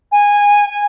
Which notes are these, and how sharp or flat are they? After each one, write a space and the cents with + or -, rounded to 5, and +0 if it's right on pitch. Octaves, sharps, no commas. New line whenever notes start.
G#5 -15